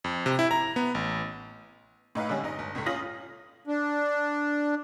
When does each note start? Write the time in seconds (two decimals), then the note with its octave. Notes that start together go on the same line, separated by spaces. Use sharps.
0.04 F2
0.26 C3
0.39 E4
0.51 A#5
0.76 B3
0.95 A1
2.15 A2 D#4 B4 F5
2.29 D3 G3 G#3 C#4
2.43 G1 D#4 D#5
2.59 G1
2.75 C#2 A2 A3
2.86 C#4 F4 D#6 A#6 F#7
3.67 D4